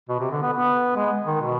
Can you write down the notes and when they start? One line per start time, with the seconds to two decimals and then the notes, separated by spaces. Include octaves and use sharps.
0.09 B2
0.20 C3
0.31 D3
0.42 B3
0.53 B3
0.96 G#3
1.26 D#3
1.41 B2